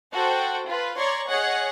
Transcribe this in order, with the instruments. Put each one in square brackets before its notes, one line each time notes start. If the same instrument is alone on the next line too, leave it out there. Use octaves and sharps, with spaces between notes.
[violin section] F#4 A4 C5 G5
F4 B4
C#5 D5 A#5 C6 C#6
G#4 C#5 D#5 F#5